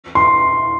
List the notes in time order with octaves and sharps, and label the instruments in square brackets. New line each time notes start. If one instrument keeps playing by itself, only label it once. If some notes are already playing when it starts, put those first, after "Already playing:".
[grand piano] C6